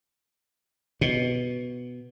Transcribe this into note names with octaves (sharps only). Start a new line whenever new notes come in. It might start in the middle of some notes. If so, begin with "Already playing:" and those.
B2